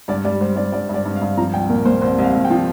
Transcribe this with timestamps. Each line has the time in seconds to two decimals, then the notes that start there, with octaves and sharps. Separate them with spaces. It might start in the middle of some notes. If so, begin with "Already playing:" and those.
0.08 G2 D5
0.24 G3 D5
0.41 G3 C5
0.56 G2 D5
0.72 G2 D5
0.89 G2 D5
1.05 G2
1.16 F5
1.21 G2
1.37 F3 A#5
1.54 C2 G5
1.69 A#2 A#4
1.85 A#2 C5
2.02 C2 C5
2.18 C2 F5
2.34 C2
2.45 G5
2.50 F3